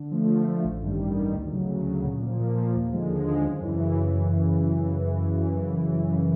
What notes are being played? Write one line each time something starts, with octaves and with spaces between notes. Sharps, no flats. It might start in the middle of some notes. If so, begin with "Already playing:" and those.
Already playing: D3
F3 A3
D3
F3 A3
A1
G2 D#3 G3
A1
G2 D#3 G3
D2
C#3 F#3
D2
C#3 F#3
A#2
F3 A#3
A#2
F3 A#3
D#2
D3 F3 G#3
D#2
D3 F3 G#3
F#2
C#3 E3